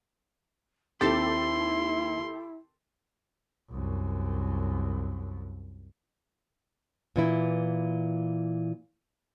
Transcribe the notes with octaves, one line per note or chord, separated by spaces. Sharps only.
D#2 C4 E4 G4 A4 C6 A6
C2 F#2
A#2 E3 E4